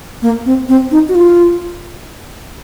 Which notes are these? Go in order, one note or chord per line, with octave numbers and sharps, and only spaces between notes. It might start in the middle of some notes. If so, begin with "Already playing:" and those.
A#3
C4
C4
D#4
F#4
F4